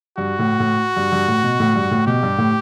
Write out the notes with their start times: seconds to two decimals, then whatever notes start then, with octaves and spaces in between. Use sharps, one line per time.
0.18 G2 F#4
0.39 A2
0.60 A2
0.96 G2
1.12 G2
1.28 A2
1.43 B2
1.60 A2
1.76 G2
1.91 A2
2.07 B2 G4
2.23 G2
2.38 A2